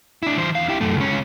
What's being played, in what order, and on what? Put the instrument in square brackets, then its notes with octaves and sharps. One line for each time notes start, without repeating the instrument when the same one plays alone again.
[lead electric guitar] D4 E4
E3 C5
E2 F5
E4 G4
F#2 A3
C#2 C#4